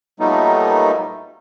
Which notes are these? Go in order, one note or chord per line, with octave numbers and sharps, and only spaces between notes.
A#2 F#3 G3 A3 B3 D#4